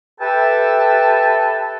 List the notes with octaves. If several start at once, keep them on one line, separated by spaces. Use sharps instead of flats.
G4 A4 B4 E5 G5 A5